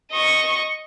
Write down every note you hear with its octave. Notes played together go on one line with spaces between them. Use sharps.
D#5 C#6